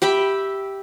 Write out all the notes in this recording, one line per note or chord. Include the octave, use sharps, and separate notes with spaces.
G4 E5 G5 B5